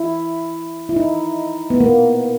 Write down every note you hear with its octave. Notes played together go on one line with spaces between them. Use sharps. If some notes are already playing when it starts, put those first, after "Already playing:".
Already playing: E4
E4
D#4
B3
A#3